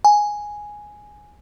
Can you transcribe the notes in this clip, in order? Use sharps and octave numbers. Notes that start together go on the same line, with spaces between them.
G#5